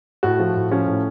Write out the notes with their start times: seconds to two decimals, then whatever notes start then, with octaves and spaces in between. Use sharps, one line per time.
0.23 A2 F#4
0.40 F3
0.56 A2
0.71 F3 C#4
0.87 A2